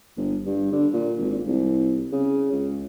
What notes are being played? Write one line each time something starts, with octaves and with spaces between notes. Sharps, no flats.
G1
G2
D3
A#2
G#1
C2
C#3
C#2